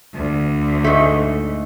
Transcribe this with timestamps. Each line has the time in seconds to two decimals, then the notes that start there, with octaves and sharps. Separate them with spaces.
0.14 D2
0.84 G#2 A3